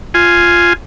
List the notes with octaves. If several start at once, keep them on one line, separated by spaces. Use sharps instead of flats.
F4 G#5